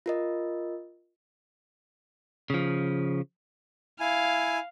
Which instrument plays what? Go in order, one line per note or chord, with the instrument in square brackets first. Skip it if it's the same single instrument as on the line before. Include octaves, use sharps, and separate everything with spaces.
[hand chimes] F4 A#4 D#5
[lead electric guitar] C#3 F3
[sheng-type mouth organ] E4 G#5 [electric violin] F5